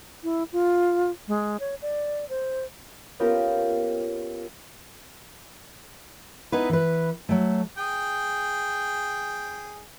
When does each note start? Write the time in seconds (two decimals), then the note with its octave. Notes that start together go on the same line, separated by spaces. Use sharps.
0.23 E4
0.53 F4
1.28 G#3
1.60 C#5
1.82 D5
2.29 C5
3.20 A#3 B3 C#4 F4 G4 A#4
6.52 B3 D#4 E4 B4
6.69 E3 B4
7.29 F#3 A3
7.78 G#4 G5